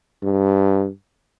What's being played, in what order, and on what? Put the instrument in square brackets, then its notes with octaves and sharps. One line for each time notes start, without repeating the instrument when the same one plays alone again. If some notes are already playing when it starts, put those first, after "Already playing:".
[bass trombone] G2